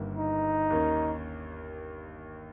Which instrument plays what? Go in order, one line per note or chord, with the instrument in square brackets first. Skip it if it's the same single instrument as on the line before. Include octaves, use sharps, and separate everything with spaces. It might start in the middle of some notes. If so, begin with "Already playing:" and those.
Already playing: [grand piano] G1 G2 D#3 A#3
[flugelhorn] D#4
[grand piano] D#2 D#3 A#3 C#4